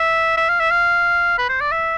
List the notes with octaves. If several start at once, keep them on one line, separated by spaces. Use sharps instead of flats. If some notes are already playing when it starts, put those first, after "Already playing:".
Already playing: E5
E5
F5
E5
F5
B4
C5
D5
E5